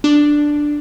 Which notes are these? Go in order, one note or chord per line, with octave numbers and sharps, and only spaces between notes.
D4